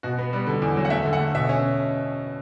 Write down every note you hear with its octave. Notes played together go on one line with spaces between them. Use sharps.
B2 F#4
B3
G3
D3
E2
F#3
F#5
A3 E5
D3
F#5
A3
B2 E5
C#4